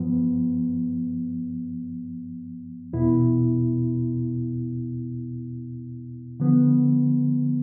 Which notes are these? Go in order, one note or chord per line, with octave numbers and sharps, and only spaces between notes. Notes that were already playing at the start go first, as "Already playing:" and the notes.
Already playing: G2 F3 B3
E2 B2 B3 E4
D3 F3 B3